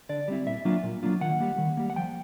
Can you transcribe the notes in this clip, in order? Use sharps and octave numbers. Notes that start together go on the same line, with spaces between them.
D3 D5
G3 C4 E4
A#2 E5
F#3 A#3 D4 F4
A#2
F#3 A#3 D4 F4
D#3 F#5
G3 A#3
D#3
G3 A#3
F#5
F3 G5